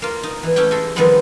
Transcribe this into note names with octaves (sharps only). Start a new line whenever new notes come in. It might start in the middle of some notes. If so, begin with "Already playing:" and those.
A#3 F4
D#4
E3
A3 C#4 E4 G4 G5
G#3 A4
D#3 F3 G3 G#3 B3 C4